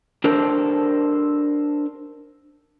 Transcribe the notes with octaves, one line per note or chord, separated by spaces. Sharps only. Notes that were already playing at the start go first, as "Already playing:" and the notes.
D4 G4 A4 A#4 C5